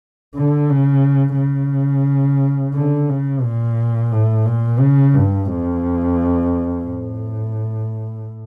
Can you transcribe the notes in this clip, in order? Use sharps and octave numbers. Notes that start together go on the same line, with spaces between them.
D3
C#3
C#3
D3
C#3
A#2
A2
A#2
C#3
G2
F2
A2